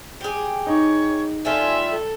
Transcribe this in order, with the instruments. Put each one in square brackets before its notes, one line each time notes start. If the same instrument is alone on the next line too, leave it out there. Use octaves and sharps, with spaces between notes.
[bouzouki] G4 G#4
[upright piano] D#4 [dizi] C#5
[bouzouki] G3 A3 F4 [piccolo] E5 [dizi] G#5
[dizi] A4